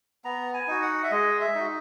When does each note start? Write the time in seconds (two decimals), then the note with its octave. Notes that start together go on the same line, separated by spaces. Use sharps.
0.24 B3 A#5
0.54 G#5
0.68 D#4 F#4
0.82 F#5
1.03 E5
1.11 G#3 D#5
1.40 E5
1.55 D#4 F#4